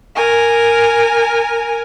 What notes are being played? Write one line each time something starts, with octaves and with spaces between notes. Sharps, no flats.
A#4 G#5